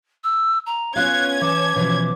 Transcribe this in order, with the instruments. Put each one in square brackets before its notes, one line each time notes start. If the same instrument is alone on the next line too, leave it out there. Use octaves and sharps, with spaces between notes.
[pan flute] E6
A#5
[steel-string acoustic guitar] B3 F4 F5 [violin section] C#4 G#6 [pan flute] F#6
[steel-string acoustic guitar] E3 A5 [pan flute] D6
[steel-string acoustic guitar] B2 E3 F3